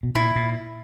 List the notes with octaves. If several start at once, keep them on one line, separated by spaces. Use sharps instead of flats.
B2
A#2 E4
A#2